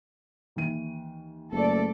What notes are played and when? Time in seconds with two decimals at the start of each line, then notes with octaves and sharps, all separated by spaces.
0.56 D#2 E3 D#7
1.51 F#1 A3 A4 D5